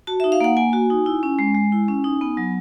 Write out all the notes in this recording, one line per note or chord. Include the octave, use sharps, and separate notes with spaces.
F#4 A5
D#4 E5
F5
A#3 F#5
A#3 G#5
F#4
D#4
E4
C#4
G#3
G#3
E4
C#4
D#4
B3
F#3